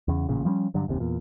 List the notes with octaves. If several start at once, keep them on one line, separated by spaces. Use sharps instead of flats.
E2 C#3
A1 A#2 C#3
F3 G3 A3 C#4
G2 D3 F#3
F#1 D#2 C3
E2 A#2